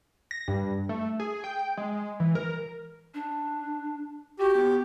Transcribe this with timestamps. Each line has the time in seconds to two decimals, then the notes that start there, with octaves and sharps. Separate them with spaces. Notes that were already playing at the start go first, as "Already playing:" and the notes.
0.31 A#6
0.48 G2
0.89 A3
1.20 G#4
1.44 G5
1.77 G#3
2.20 E3
2.35 A#4
3.14 D4
4.39 F#4 G4
4.56 B3